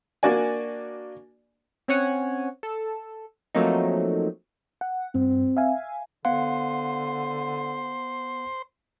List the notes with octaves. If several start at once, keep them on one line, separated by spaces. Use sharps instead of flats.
A#3 D4 F#4 D5 G#5
C4 C#4 C#5 F#5 G#5
A4
F3 F#3 A3 A#3 C4 D#4
F#5
G2 C4
E5 F5 G#5
D3 B3 C5 F5 F#5 C6